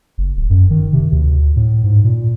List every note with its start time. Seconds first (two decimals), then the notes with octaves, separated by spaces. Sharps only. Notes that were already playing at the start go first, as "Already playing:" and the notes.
0.18 F#1
0.37 D1
0.50 F#2
0.70 D#3
0.93 C3
1.12 D2
1.56 A2
1.84 G#2
2.04 A#2